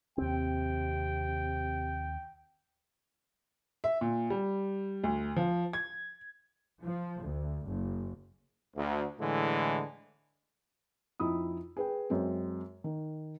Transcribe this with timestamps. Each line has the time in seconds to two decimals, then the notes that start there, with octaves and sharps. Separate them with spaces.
0.18 D#2 C3 C4 G5
3.84 E5
4.01 A#2
4.30 G3
5.04 D2
5.36 F3
5.73 G#6
6.84 F3
7.24 D2
7.66 F#1
8.76 D2
9.20 A2 D3 E3 G#3
11.20 F2 D#4 E4 D#6
11.77 G#4 B4 G5
12.10 F#2 G#3 C4
12.84 D#3